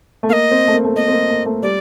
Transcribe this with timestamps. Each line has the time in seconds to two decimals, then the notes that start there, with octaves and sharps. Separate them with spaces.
0.23 A3
0.29 A#3 F5
0.33 D#5
0.51 C4
0.67 A3
0.74 A#3
0.85 A3
0.96 A#3 D#5
1.08 C4
1.12 A#3
1.30 A#3
1.46 A3
1.63 G3 D5